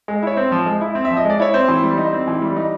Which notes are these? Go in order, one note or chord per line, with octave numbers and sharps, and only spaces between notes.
G#3
E4 C#5
C4 C5
F3
G#3
E4
C4
E5
F3
D#5
G#3 D5
E4 C#5
C4 C5
E3
G3
D#4
C4
E3
G3
D#4